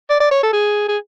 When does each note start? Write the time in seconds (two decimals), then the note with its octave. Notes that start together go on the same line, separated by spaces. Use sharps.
0.10 D5
0.21 D5
0.31 C#5
0.43 A4
0.53 G#4
0.89 G#4